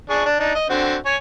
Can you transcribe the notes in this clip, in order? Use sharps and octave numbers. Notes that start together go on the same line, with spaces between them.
D4 G#4 C#6
D4
D4 D#4
D#5
D3 C4 F#4
C#5 G#5